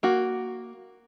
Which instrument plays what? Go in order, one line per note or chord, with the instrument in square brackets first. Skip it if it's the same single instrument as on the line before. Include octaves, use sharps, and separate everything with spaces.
[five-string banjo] A#3 F#4